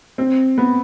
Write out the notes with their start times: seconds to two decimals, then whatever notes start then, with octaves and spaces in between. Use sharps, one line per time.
0.18 C4
0.58 B3